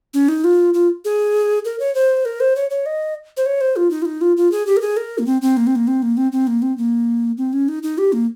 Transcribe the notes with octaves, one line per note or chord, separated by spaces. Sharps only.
C#4
D#4
F4
F4
G#4
A#4
C#5
C5
A#4
C5
C#5
C#5
D#5
C5
C#5
C5
F4
D#4
F4
D#4
F4
F4
G#4
G4
A#4
G#4
A#4
A#3
C4
C4
A#3
C4
A#3
C4
A#3
C4
C4
A#3
C4
A#3
C4
C#4
D#4
D#4
G4
A#3